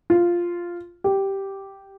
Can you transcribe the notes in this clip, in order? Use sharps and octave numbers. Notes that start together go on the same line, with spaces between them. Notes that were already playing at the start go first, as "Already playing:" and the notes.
F4
G4